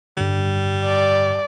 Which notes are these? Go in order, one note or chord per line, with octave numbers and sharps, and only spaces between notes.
G2 D3 G3
D5